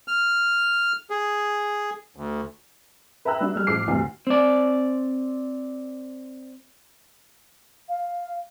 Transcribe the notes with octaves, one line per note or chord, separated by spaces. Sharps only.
F6
G#4
D2
B4 E5 G5 A#5 E6 F#6
G3 D4 F#4
G3 F6
A1 F3 G#3 D6 C7
D2 G2 C3 E3 G3
C4 D5
F5